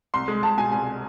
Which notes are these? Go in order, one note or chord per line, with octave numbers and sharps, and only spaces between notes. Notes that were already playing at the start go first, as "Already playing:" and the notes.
C2 C6
G#3
C2 A5
B2 G#5
C2 G#5